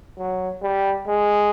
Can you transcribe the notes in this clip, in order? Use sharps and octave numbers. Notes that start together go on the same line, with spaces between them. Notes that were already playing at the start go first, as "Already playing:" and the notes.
F#3
G3
G#3